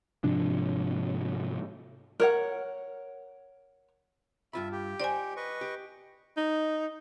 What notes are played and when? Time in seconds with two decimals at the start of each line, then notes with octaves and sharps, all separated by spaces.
0.24 G#2 C3 F3 D4
2.20 A#4 C#5 F#5
4.53 G2 F4 E5 B5
4.72 G4
5.00 D#4 C5 D5 G#5
5.37 B4 D#5 C#6
5.61 G4
6.37 D#4